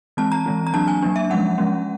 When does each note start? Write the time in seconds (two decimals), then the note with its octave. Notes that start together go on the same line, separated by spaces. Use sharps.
0.17 E3 G#3 C4 A5
0.32 A#5
0.46 E3 G#3 C4
0.67 A#5
0.73 F#3 A#3 D4 A5
0.88 G#5
1.02 F#3 A#3 D4
1.16 E5
1.30 F3 G#3 C#4 F#5
1.58 F3 G#3 C#4